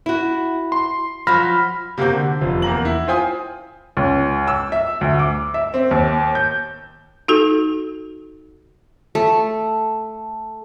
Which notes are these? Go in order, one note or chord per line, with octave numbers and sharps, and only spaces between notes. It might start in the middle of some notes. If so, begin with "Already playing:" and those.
E4 F#4
C6
F3 F#3 B5 F6 A#6
C3 A#3 C4 F#4 G6
D3
F1 F3
E2 A#3 A#5 F#7
E4
F4 C5 G5 G#5 D#6
C#2
E6
E5
D2
D6
E5
C4
D#2
G6
D#4 F#4 A4
A3